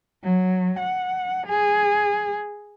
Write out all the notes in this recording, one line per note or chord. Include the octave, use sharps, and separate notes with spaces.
F#3
F#5
G#4